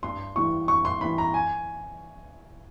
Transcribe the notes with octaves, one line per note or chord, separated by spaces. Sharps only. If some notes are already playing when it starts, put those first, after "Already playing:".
G2 C6
E3 G3 C#6
G2 C#6
C6
E3 G3 B5
A#5
G#5